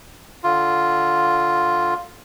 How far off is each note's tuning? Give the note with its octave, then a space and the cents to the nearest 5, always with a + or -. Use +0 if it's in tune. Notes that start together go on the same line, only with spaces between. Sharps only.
D3 +0 F4 +0